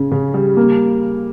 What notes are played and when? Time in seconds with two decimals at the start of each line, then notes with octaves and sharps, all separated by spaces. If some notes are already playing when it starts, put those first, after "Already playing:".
Already playing: C#3 C#4
0.12 C#3
0.34 G3
0.57 A#3